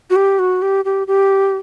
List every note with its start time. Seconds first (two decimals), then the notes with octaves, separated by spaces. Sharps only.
0.10 F#4
0.16 G4
0.39 F#4
0.62 G4
0.85 G4
1.07 G4